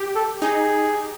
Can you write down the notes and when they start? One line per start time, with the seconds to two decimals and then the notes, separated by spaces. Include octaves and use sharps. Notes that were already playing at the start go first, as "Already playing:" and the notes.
Already playing: G4
0.15 A4
0.42 D#4 G#4